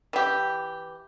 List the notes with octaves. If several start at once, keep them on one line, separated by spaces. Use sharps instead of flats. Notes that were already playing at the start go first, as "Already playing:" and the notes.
E3 G4